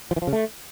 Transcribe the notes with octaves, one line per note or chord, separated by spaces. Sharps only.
F3
E3
F3
C#3
A3